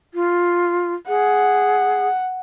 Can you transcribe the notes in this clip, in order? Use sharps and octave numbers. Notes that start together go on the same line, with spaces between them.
F4
G#4 F#5